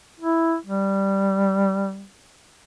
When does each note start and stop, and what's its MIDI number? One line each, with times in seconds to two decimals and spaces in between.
0.20 0.55 64
0.66 2.05 55